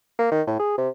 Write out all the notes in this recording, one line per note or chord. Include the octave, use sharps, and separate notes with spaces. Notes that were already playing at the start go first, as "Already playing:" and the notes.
A#3
D#3
A2
G#4
C3